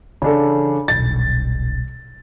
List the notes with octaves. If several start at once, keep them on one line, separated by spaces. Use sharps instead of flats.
C#3 E3 D4 A4
D#1 B1 A6